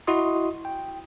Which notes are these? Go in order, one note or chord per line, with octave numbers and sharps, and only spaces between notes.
E4 F#4 D#5 C6 D#6
G5